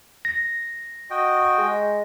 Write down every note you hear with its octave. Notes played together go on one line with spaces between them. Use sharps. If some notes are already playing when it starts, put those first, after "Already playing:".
A#6
F#4 D#5 G5
G#3